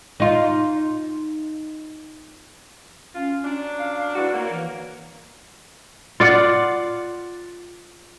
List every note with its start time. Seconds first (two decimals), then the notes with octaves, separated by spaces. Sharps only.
0.20 D#4 F4
3.15 C#4 F4
3.44 F#3 D4
3.78 F5
4.16 G#2 E4 F#4 B4 D5
4.33 A#3 C#5
4.51 E3
6.20 F4 D5 F#5